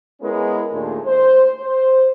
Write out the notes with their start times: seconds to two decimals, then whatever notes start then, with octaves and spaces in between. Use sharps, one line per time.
0.21 G#3 B3 C#4 E4 A#4
0.72 D#2 A#2 G#3 A3 D4
1.06 C5
1.60 C5